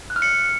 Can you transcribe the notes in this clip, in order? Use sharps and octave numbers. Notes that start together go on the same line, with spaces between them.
F#6
F6
C#7